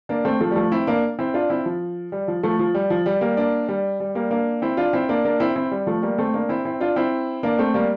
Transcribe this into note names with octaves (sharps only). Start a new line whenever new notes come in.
A#3 D4
A3 C4
F3 A3
G3
F3 A3
C4 E4
A#3 D4
C4 E4
D4 F4
C4 E4
F3
G3
F3
F3 A3
F3
G3
F3
G3
G3 A#3
A#3 D4
G3
G3
G3 A#3
A#3 D4
C4 E4
D4 F4
C4 E4
A#3 D4
A#3 D4
C4 E4
C4 E4
G3
F3 A3
G3 A#3
A3 C4
A#3 D4
C4 E4
C4 E4
D4 F4
C4 E4
A#3 D4
A3 C4
G3 A#3